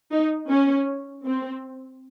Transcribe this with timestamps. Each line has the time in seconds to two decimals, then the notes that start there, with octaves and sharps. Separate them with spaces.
0.11 D#4
0.49 C#4
1.24 C4